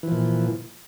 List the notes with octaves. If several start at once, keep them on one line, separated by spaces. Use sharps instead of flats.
A#2 E3 F3